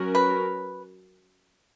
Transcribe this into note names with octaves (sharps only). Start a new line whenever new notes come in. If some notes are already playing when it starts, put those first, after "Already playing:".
Already playing: F#3 C#4 F#4 A#4
B4